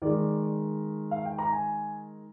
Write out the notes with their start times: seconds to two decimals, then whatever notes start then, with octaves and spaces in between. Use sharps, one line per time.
0.02 D#3 G#3 D5
1.11 F5
1.25 G5
1.38 A#5
1.52 G#5